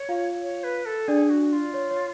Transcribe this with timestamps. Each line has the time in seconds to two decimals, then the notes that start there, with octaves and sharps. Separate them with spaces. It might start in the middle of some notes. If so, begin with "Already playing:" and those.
Already playing: C#5
0.09 F4 F5
0.42 C#5
0.64 B4
0.86 A4
1.08 D4 G#4 D5
1.30 F#4
1.53 F4
1.74 C#5
1.90 C#5